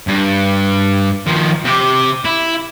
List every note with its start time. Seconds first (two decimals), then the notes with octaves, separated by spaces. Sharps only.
0.08 G2
1.27 D#3 F3
1.65 C3 G4
2.25 E4